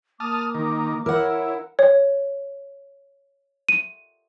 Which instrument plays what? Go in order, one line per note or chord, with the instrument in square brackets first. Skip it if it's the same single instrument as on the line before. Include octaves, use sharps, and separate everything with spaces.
[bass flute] A#3 [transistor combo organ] A5 D#6 F6 [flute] D6
[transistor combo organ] D#3 A#4
[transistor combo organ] E4 [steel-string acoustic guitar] A#4 F#5 [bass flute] C#5
[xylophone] C#5
D#7